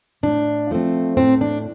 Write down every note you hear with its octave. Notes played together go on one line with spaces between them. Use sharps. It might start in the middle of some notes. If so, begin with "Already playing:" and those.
A2 D4
F3 A3 C4
A2 C4
D4